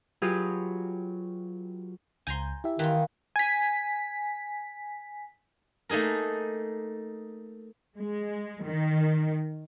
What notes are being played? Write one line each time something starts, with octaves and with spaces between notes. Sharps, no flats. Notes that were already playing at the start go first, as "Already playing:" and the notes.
F#3 F4 G4 G#4 B4 D#6
C#2 G#5 A#5 C6 G6
E4 G4 E5
D#3 E3 F4
G#5 B6
A3 A#3 D#4 G#4 A#4
G#3
D#3